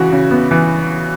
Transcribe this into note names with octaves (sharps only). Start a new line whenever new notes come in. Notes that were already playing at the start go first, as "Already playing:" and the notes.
Already playing: C#3 E3 F#4
C#3
B3
E3